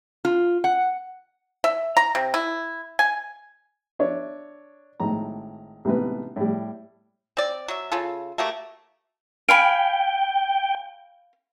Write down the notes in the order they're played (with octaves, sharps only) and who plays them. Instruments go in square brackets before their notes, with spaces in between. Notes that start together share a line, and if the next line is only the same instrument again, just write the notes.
[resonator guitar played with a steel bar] F4
F#5
[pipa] E5
A#5
C3
E4
G#5
[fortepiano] D4 C#5 E5
G#1 A2 A#5
A1 G#2 C3 B3 B4
A2 G3
[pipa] C4 D5
F#3 E5
C#3 F4 A4
A3 A#3 F#4 G4
[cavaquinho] F5 G#5 B5 [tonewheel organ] G5